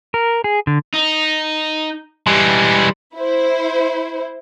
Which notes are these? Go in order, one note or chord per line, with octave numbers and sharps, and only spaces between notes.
A#4
G#4
D3
D#4
E3 G3 G#3
E4 C5